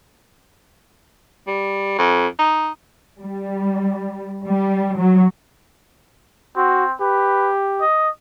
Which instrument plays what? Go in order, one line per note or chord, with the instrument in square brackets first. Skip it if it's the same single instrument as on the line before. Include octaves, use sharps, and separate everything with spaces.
[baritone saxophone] G3
F2
D#4
[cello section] G3
G3
F#3
[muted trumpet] C4 [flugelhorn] F#4
[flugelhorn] G4 [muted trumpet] B4
[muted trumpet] D#5